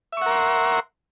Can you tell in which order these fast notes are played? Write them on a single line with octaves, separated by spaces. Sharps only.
E5 C#6 F#5 A#4 C6